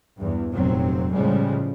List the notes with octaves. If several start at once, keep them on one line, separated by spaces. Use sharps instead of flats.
E2 G2
F1 A#2 F#3 C4
A2 C#3 F3 G3 G#3